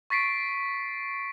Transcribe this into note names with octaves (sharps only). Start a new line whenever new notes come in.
C#6 A6 B6 C7 D7